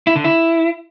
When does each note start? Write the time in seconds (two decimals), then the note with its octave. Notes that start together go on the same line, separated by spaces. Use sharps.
0.07 E4
0.16 D3
0.24 E4